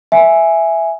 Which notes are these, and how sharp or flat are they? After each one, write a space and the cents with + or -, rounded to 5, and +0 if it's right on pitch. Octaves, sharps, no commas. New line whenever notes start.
E5 +0 G#5 +0